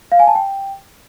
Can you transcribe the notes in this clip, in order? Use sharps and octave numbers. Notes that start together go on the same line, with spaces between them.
F5
G#5
A5
G5